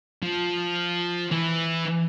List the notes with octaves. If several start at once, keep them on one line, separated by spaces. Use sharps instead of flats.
F3
E3